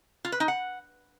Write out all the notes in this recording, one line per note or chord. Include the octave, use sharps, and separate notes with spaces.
F4
B4
D#4
F#5